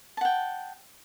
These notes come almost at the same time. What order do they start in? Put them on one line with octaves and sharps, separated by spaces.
A5 F#5 G5